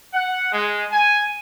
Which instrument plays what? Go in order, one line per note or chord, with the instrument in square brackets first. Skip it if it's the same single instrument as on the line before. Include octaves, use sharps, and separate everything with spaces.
[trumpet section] F#5
G#3
G#5